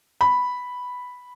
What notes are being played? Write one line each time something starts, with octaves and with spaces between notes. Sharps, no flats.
B5